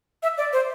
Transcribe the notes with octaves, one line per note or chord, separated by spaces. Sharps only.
E5
D5
C5